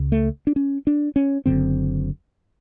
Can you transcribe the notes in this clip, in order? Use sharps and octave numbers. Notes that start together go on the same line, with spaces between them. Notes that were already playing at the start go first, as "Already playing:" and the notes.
Already playing: C#2 C#3
A3
D4
C#4
D4
C#4
F#1 F#2 D3 C4